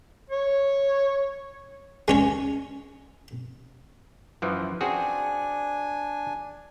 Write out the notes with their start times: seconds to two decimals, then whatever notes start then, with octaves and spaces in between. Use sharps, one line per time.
0.30 C#5
2.08 G#3 C#4 C#5
4.42 F#2 E3 F3
4.81 C4 D4 F#4 G#4 G#5